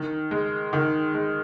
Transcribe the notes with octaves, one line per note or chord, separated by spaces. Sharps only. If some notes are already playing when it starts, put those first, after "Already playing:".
Already playing: D#3
G#3
D#3
G#3